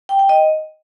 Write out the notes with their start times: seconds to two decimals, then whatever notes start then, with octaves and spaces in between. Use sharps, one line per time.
0.09 G5
0.19 G5
0.29 D#5